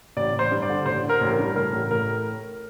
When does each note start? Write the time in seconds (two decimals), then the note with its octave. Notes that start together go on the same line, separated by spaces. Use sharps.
0.17 A1 D5
0.33 A1
0.39 C5
0.51 G2
0.62 D5
0.69 D3
0.86 A1 C5
1.04 D3
1.09 A#4
1.21 A1
1.33 A#4
1.39 G2
1.56 A2 A#4
1.73 A1
1.91 A2 A#4